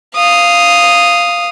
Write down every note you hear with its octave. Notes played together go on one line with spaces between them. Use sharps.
F5 D#6